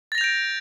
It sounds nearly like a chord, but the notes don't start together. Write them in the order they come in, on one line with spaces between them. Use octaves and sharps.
A6 A#6 F7 G6 D7